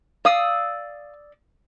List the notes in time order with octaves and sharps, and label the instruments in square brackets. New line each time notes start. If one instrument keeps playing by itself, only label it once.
[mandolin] D5 D#6 E6 [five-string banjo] F5